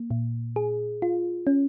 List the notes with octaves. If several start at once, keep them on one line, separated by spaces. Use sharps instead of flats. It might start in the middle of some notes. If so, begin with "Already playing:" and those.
Already playing: A#3
A#2
G#4
F4
C#4